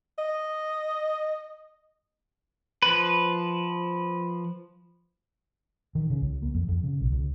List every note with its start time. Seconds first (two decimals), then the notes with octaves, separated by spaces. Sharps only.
0.19 D#5
2.82 F3 B4
5.95 D#3
6.10 C#3
6.21 C#2
6.42 A#3
6.54 F2
6.68 F2
6.83 C#3
7.01 B1
7.12 C#2